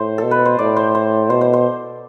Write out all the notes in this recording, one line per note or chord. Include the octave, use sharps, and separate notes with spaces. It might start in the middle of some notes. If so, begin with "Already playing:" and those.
Already playing: A2 C5
A4
B2
B4
C5
A2 D5
C5
C5
B2 C5
C5
C5